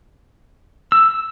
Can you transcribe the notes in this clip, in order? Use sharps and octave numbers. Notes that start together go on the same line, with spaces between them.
E6